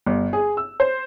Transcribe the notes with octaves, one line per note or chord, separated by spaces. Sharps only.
G1
G#4
E6
C5